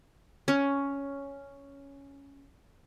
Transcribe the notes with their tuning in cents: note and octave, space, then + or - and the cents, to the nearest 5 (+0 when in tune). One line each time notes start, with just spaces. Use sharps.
C#4 +5